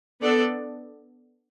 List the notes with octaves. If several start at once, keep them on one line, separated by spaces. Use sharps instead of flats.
B3 D4 A4 D5